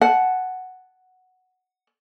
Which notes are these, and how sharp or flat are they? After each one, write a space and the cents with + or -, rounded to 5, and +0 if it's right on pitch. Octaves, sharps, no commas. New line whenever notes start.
F#5 +0 A5 -25